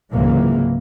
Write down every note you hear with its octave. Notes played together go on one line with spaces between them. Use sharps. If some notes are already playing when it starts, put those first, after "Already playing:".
C#2 G#2 C3 E3 F#3 A#3